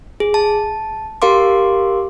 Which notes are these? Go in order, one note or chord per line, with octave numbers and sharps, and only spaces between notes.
G#4
A5
G4 A#4 F5 C6 D6